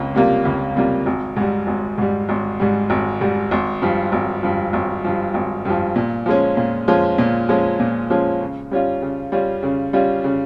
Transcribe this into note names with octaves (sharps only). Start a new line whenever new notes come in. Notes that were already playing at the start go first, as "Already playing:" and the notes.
Already playing: C#2 C3 A#3 F4
C3 G3 A#3 F4
C#2
C3 G3 A#3 F4
G#1
G#2 G3
G#1
G#2 G3
G#1
G#2 G3
G#1
G#2 G3
G#1
G2 F3
G#1
G2 F3
G#1
G2 F3
G#1
G2 F3
A#2
F3 G#3 C#4
A#2
F3 G#3 C#4
A#2
F3 G#3 C#4
A#2
F3 G#3 C#4
C#3
G3 C#4 F4
C#3
G3 C#4 F4
C#3
G3 C#4 F4
C#3